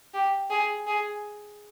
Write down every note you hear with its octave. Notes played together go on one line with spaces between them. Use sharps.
G4
G#4
G#4